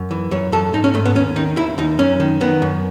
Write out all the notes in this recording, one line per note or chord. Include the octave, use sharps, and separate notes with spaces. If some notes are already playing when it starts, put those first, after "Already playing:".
Already playing: F#2
E3
F#2 C#5
F#2 A4
G#2 D#4
C#4
G#2 A3
B3
D#2 C#4
D#3 D#4
D#2 E4
D#2 D#4
F#2 C#4
D#3
D#3 B3
F#2